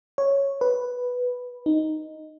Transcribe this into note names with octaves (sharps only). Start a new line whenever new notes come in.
C#5
B4
D#4